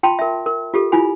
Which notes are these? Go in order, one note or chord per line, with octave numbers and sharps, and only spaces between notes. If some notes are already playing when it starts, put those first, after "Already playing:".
F4 G5 A5 B5 C6
A#4 E5
A#4
F4 G4 A4
E4 F4 G#5 B5